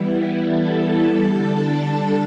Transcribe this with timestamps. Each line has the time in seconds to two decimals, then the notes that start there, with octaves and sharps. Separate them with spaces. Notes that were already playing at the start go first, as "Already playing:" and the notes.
Already playing: E3 G3 B3 E4
0.46 A4 A5
1.19 D3 G3 D4 A4 A5